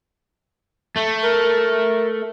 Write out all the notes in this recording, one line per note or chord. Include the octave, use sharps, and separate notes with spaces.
A3
A#4